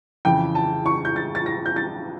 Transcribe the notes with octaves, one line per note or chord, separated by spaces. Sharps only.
F2 C#3 E3 G5
A5
C#6
G6
A6
A6
A#6
G6
A6